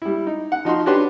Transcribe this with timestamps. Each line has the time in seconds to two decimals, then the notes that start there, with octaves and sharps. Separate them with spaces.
0.02 G3 E4
0.27 D#4
0.52 F#5
0.65 F3 D#4 F#4 C6
0.86 C#4 D4 F#4 G4 B4 C6